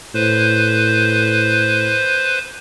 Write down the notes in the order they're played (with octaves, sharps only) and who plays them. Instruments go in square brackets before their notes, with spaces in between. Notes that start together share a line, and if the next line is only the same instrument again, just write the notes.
[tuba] A2 [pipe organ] B4 C5